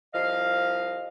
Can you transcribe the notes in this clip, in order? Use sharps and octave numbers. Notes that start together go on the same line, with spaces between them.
C2 F3 D#5 F5